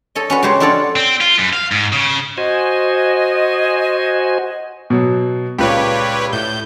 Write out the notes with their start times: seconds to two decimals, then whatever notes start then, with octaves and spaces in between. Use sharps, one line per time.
0.15 A4 C#5 D#5
0.30 C#4 F#4 B4
0.43 C#3 G#3 G4 C5 C#5 A#5
0.60 D4 F4 F#4 A4 C#5 D5
0.96 C4
1.21 F4
1.39 F#2
1.53 F5
1.72 G#2
1.92 C#3
2.38 F#4 C5 D#5 G#5
4.90 B2 F#3
5.58 C#2 A#2 G4 B4 C#5
6.33 A2 G6